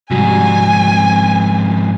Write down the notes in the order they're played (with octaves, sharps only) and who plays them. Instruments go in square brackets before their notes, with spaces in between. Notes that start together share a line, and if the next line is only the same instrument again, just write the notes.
[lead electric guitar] F2 G#2 [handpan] C3 G3 F#4 [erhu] G#5